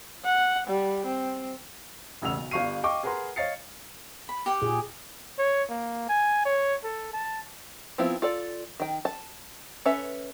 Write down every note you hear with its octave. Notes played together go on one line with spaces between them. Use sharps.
F#5
G3
C4
E1 A1 C#3 F#5 E6 F7
B1
G1 G2 F5 C#6 C7 D#7
D#5 F5 G5 C#6 D6
G#4 A#4 B4 F#5 A#5 C6
C#5 D#5 F5 A6 C7 C#7
B5
G4 F#5 G5
A#2 G#4
C#5
A#3
G#5
C#5
A4
A5
F3 B3 C4 E4 F4
F4 A4 D5
D#3 G5
A5
C#4 A4 B4 E5